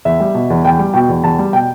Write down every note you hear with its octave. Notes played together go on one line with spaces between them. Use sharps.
E2 E5
G3
B2
E2
E2 G5
G3
B2 G5
E2
E2 A5
G3
B2 G5